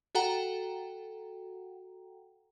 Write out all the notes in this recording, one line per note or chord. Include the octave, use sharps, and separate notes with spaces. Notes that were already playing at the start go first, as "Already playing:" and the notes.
F#4 A4 F#5 G5 A#5